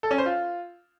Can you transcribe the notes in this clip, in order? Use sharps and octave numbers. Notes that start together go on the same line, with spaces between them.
A4
C#4
C5
F4